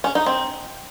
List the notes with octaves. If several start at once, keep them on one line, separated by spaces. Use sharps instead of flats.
C#4
D#4
C4